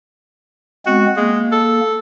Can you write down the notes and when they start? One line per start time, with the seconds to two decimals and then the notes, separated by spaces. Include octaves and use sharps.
0.86 G#3 B3 C4 F#4
1.17 G#3 A#3
1.52 A4